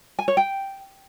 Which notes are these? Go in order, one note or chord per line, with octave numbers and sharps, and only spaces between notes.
G#5
C#5
G5